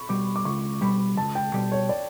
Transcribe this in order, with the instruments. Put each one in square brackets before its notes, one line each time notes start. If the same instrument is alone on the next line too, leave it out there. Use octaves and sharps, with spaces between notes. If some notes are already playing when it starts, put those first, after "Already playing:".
Already playing: [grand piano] B5 C#6
[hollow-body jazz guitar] B2 G3 [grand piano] D6
[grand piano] D6
[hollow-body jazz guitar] C#2 [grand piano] C#6
[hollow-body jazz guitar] B2 G3 [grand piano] B5
[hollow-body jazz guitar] C#2 [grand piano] A5
[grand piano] G5
[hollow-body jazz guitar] B2 G3
[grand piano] C#5
D5